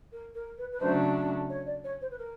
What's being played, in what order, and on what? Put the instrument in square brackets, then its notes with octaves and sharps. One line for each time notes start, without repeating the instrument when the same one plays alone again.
[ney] A#4
A#4
B4
B4
[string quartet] C#3 F#3 A3 D4 [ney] C5
[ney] C#5
D5
C#5
C5
B4
A#4